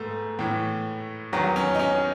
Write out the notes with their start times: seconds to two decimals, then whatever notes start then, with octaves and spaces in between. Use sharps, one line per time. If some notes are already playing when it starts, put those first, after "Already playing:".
Already playing: G#2 A3 B3
0.39 A2 E3
1.33 E2 D#3 F#3 B3
1.56 C#4
1.75 D#4
1.79 C#4